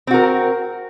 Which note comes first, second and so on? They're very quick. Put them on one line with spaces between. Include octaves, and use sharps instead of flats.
C4 F#4 A#4